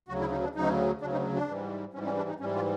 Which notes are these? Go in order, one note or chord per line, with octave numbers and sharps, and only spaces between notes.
D2 C#3 F#3 F#4
E4
D#4
D4
D2 C#3 F#3 D#4
D2 C#3 F#3 D4
D#4
D4
G#2 E3 G3
G#2 E3 G3 C#4
C#4
D4
D#4
G#2 E3 G3 C#4
F4